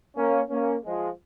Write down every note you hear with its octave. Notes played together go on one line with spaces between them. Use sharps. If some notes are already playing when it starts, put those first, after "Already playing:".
A#3 C#4
A#3 C#4
F3 G#3